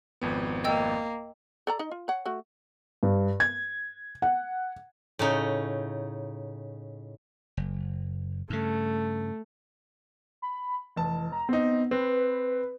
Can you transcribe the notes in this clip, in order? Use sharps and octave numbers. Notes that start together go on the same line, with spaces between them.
G#1 F2 B3
A#3 D#5 G5 E6
A4 D5 A#5
D#4 D#5
F4
C#5 F#5
A3 F#4
G2
G#6
F#5
A2 C#3 D#4
F#1
G2 C#3 A3
B5
F1 E3 A5
A#5
B3 C4 D#4
C4 B4